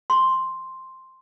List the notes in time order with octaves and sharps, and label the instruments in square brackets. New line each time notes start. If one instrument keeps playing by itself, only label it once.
[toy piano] C6